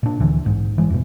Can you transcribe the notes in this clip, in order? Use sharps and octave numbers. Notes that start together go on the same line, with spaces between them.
A#2 D4
D2 D3 E3
A#1 G#2
E3 G#3
F2 B2